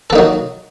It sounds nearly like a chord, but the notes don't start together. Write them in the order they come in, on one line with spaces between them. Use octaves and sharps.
A4 A#3 D#4 F#3